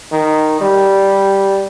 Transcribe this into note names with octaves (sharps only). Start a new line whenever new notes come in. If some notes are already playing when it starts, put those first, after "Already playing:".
D#3
G3